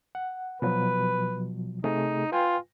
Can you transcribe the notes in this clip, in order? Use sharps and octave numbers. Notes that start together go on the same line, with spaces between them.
F#5
B2 F3 F#3 B4
C3 A3 D#4 G#4
F4 B4 G5 G#5